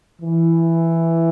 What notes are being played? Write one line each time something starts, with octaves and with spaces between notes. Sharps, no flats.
E3